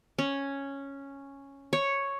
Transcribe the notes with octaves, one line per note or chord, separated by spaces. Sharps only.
C#4
C#5